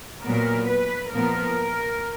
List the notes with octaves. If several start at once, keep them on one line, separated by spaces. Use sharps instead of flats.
A#2 F#3 B3 A#4
B4
A#2 F3 B3 A#4